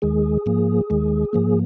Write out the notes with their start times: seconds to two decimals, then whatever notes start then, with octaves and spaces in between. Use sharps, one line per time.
0.02 D#2 D#3 G#3 G#4
0.46 G#2 F3 A#3
0.90 D#2 D#3 G#3
1.33 G#2 F3 A#3